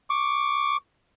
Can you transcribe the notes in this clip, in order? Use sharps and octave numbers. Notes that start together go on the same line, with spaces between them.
C#6 D6